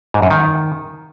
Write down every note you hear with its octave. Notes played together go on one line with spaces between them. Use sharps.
G#2
F#2
D#3